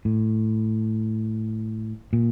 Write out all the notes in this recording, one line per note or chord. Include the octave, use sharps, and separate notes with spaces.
A2
A#2